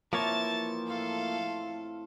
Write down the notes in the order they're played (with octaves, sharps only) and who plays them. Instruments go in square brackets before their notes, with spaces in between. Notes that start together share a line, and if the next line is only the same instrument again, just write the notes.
[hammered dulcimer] E3 C4 [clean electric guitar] F3 A#3 C#5 [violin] A5 A6
[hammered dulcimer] A2 A3 F4 [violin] A4 F5